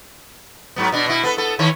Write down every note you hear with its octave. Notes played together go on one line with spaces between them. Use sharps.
G#2 F#3 B3
B2 D4
B2 E4
B3 A4 B4
B3 A4
D#3 E3 C#5